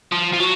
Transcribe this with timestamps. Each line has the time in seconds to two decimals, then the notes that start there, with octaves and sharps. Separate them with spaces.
0.12 F3
0.34 F3
0.40 F#3